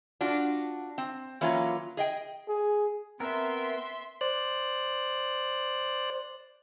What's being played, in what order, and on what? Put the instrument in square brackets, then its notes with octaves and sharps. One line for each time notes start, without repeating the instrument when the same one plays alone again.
[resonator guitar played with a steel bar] D4 F4 F#4
C4
E3 F#3 A#3 C#4 F4 B4
G#4 D#5 G5
[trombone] G#4
[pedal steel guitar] B3 A#4 [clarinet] C4 [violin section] E5 C6
[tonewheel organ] C5 D5 F#6